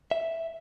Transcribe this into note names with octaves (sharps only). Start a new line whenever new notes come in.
E5